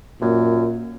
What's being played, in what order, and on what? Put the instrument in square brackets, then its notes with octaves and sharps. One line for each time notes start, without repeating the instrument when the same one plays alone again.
[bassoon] F#2 [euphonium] A#2